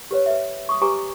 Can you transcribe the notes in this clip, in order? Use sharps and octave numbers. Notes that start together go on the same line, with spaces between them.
G4 B4 C#5
B4 E5
C#6 D#6
G4 B4 G#5 A#5 C#6 D6